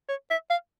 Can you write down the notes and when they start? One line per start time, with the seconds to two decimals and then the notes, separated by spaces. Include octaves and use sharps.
0.09 C#5
0.30 E5
0.50 F5